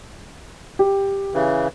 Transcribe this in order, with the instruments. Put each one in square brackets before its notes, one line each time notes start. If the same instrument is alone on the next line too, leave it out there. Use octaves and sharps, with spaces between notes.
[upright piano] G4
[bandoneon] C#3 E3